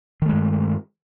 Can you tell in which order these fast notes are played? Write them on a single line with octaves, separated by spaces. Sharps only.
D#3 A3 G#3 G2